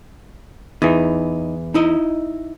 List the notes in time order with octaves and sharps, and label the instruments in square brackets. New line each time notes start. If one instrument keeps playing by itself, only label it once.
[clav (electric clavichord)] E2 E3 [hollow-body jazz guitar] D#4
[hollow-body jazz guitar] D#4 E4 D#5